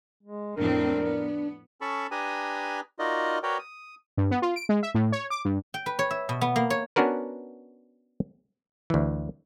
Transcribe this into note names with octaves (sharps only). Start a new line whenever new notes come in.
G#3
F2 A2 C4 D4 A#4
B3
C#4 A4 A5 B5 C#6
D4 G4 B4 G#5 A#5 D#6
D#4 F4 F#4 A#4 D5 D#5
F#4 A#4 B4 C#5 D5 G5
D#6
G2
B3
F4
D7
G#3
E5
A2
C#5
D6
G2
G5
B4
C#5
E5
B2
B3
A#3
C#5
B3 C#4 D4 F#4 A#4 B4
D2 E3